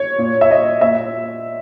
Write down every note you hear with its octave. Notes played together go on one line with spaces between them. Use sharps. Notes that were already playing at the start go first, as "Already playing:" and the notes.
Already playing: C#5
A#2
E5
D#5
A#2 E5